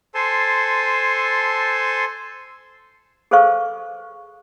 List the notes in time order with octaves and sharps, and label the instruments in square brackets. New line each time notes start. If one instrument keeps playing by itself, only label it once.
[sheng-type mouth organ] A4 C5 G#5 A5 C6
[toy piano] G#4 A4 B4 C5 F5 C#6